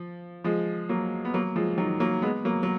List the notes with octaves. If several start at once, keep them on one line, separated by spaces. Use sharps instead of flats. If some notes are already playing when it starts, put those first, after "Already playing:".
Already playing: F3
F3 G#3
F#3 A#3
B3
F#3 A#3
F3 G#3
D#3 F#3
F#3 A#3
G#3 B3
F#3 A#3
F#3